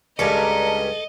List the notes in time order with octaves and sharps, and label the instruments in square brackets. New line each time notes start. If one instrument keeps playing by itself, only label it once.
[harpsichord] C#2 G2 [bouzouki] D4 A#4 [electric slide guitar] A4 [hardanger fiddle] D#5